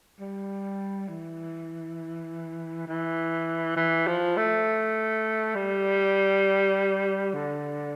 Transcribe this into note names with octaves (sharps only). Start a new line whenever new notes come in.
G3
E3
E3
E3
F3
A3
G3
D3